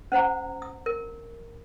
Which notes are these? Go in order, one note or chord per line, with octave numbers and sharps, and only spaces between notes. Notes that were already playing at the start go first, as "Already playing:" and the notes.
C#4 C5 F#5 A#5
D#6
A#4